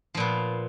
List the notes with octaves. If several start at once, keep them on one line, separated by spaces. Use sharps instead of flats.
A#2 F3 B3